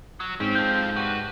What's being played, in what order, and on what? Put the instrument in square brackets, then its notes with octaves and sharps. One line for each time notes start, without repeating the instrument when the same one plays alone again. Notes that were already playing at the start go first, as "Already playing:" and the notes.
[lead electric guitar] F#3
[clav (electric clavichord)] G#2 [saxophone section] C4 [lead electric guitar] C#4
[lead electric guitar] F4 A4 [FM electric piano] G6
[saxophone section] D4 G4 B4 [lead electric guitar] F#4